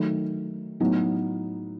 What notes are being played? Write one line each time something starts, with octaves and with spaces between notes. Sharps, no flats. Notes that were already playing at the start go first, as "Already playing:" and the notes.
Already playing: D#3 F#3 A3
A2 F#3 B3 D#4